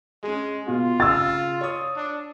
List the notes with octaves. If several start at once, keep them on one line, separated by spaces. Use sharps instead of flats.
G#3 C#4 G#4
B2 F4
C#3 E6 A6
C#5 D#6
D4